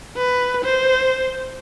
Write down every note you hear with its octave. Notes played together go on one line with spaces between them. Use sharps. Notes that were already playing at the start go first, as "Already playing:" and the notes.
B4
C5